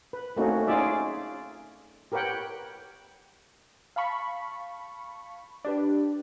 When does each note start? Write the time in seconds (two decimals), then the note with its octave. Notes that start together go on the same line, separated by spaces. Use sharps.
0.13 B4
0.37 A3 A#3 C4 C#4 D#4 F#4
0.67 C#4 D#4 F4 G#4 D5 E5
2.12 G4 A#4 B4 C#5 F#5 G5
3.96 F5 A5 B5 C#6
5.65 D4 G4 B4